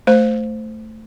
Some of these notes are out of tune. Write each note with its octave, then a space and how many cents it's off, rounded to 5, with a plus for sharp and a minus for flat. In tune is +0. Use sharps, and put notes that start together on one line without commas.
A3 +0 C5 -5